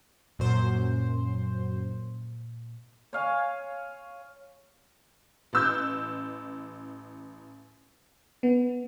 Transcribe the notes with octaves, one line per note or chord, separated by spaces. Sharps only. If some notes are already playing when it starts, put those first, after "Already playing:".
F#2 A#2 C5
C#5 F5 G#5
A1 E6 G6
B3